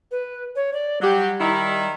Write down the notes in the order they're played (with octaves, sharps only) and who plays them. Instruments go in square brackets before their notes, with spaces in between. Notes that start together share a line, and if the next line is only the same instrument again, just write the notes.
[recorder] B4
C#5
D5
[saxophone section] F#3 F#4 G4 [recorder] G3
[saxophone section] D#3 D#4 E4